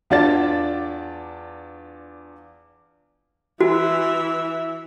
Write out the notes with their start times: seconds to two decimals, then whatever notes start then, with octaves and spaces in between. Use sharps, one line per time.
0.10 E2 D4 F4 D5 A5 A6
3.61 E3 F#4 E5